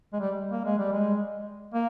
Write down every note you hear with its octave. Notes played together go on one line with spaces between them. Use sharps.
G#3
G3
A#3
G#3
G3
G#3
A#3